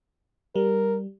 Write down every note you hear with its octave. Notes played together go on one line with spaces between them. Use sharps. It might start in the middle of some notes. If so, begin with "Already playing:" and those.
G3 A#4